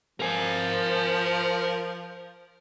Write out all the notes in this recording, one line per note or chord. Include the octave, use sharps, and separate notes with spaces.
F3 A#4 G#5